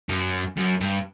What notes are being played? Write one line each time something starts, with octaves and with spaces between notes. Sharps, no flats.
F#2
F#2
G2